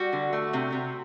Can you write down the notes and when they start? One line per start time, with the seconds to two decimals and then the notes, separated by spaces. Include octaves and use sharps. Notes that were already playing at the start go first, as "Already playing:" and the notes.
Already playing: G3 F#4
0.13 D3
0.33 A3
0.53 C3
0.72 C3